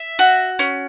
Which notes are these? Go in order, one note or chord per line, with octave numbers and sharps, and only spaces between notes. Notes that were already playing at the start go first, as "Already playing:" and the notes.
Already playing: E5
F#4
C#4